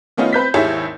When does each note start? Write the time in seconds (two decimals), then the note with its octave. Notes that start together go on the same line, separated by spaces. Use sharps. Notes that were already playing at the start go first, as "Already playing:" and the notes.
0.17 D#3 A3 B3 C#4 D#4 F4
0.33 C4 B4 G6 B6
0.54 G#1 D#2 E4 G4 G#4 C#5